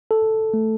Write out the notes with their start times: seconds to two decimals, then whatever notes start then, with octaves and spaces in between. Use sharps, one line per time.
0.11 A4
0.54 A3